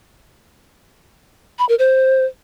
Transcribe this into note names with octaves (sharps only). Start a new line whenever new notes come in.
B5
A#4
C5